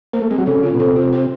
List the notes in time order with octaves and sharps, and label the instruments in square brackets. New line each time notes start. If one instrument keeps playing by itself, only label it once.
[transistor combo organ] A#3 [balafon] C5
[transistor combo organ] A3
[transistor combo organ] G#3 [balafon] C4
[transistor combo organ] F#3
[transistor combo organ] C#3 [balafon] A4
[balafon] F4
[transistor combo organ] B2
[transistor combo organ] C3 [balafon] A4
[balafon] F4
C5